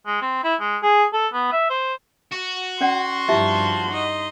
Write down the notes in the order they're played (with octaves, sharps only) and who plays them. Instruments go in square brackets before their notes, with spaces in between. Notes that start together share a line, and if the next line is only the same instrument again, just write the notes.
[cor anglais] G#3
C4
E4
G#3
G#4
A4
B3
E5
C5
[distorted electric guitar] F#4
[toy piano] C#4 D5 F#5 [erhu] C6
[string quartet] G2 F3 A5 [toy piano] E4 G4 E5
[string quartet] D#4 D#5